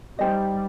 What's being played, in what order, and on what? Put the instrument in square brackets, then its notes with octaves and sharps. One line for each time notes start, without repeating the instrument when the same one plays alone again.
[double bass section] G3 [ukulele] D#4 G4 C5 D#5